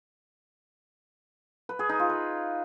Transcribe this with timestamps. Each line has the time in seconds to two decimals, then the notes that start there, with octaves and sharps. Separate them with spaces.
1.69 B4
1.79 G#4
1.89 D#4
1.99 F4
2.10 B4